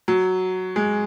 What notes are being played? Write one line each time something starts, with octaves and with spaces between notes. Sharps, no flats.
F#3
G#3